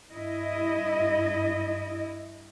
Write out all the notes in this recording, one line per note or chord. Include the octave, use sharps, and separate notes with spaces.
G2 E4 D#5